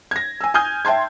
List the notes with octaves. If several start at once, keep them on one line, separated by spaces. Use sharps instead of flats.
G#6 A#6
G#5 E6
G#5 D#6 F6 G6 G#6
E5 G5 A5 C6 G#6